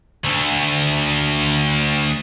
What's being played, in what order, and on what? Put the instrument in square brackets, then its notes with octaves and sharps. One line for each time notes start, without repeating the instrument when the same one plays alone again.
[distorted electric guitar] D2 A3